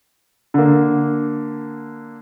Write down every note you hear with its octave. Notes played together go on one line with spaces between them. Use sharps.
D3 A#3